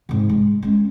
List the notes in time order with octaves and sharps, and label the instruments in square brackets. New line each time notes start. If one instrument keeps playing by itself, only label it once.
[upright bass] G#2 C3
G#3
G#3 C#4